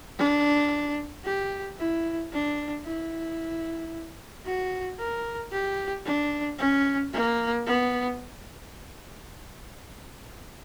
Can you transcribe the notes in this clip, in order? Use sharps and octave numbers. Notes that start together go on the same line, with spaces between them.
D4
G4
E4
D4
E4
F#4
A#4
G4
D4
C#4
A#3
B3